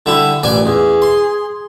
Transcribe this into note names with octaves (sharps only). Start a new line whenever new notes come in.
D3 G3 E4
A1 A#2 D5 G#5
E2 G#4
C6